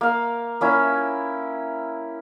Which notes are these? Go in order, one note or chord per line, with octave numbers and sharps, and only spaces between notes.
A#3 F5
A#3 C#4 E4